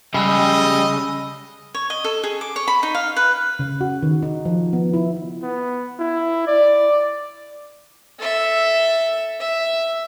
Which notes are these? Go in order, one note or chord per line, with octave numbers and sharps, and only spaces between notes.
C#3 G3 G#3 G4 D#5 B5 E6 F#6
C#5
D#5
A4
G#4
D6
C#5
B5
D#4
F5
B4
C#3
F#4
D#3
D#4
F3
B3
E4
B3
E4
D5
A4 E5
E5